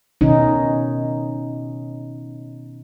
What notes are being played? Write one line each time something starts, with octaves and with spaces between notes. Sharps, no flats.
B2 D#3 C#4 D#4